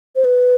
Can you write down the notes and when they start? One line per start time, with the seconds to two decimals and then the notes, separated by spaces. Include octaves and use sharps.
0.16 C5
0.25 B4